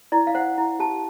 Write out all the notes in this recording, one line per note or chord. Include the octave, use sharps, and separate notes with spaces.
E4 D5
F5
C5 F#5
E4
G4 A5